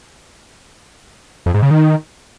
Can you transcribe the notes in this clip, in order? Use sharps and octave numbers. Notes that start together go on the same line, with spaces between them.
F2
G#2
C#3
D#3